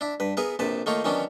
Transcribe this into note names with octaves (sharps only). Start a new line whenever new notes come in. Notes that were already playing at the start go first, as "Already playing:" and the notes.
D4 E4
G2 B4
B3 E4 G#4 A#4 B4
A#1 C3 B4 A5
D#3 A3 A#3 D#4 F4 C#5
D#3 E3 F#3 B3 C#4 D4